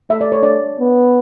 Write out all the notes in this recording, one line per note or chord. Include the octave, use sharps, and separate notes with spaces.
A3 E5
D5
C#5
D4 D5
B3